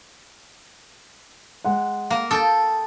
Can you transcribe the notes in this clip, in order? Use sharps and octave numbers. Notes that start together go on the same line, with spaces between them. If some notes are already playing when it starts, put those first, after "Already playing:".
G#3 F#5
A#3
A4 G5 D#6 A6